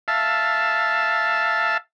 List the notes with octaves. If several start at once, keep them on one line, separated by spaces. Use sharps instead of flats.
E5 F5 A5